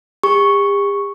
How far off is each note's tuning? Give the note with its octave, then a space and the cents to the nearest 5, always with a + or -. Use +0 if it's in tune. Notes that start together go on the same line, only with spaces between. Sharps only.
G4 +45 C#6 +0